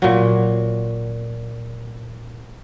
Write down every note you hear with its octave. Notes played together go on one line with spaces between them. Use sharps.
A#2 F#3